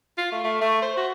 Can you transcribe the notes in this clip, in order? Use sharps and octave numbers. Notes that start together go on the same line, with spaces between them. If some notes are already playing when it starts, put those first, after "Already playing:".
F4
A3
A3
A3
C5
F#4